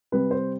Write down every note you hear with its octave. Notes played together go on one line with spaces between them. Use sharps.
C3 G3 B4
C5